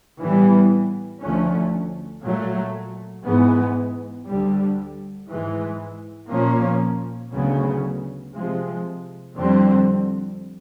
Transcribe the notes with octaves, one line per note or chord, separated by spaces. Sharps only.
A2 E3 G3 B3
D2 D3 F3 A3 C#4
A#2 F#3 A3
G#2 E3 G#3 B3
D2 D3 G3
G#2 E3 G#3
A#2 F3 A#3 C#4
D2 C#3 F#3 B3
C3 F3 G#3
F2 D3 G3 C4